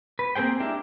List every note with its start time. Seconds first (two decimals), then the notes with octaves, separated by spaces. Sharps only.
0.19 B4
0.36 A#3 C4 G#4 C5 G5
0.60 G#3 D4 E4 G4 A#4